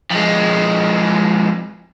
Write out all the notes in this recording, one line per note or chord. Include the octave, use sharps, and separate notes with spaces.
F2 G#3